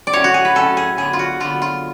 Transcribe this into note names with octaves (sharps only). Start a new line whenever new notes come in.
D5
A2 F#3 C#4 C#5
F#4
G#4
B4
A2 F#3 C#4 A4
G#4
D3 F#3 B3 G#4
F4
F#4
D3 F#3 B3 F4
F4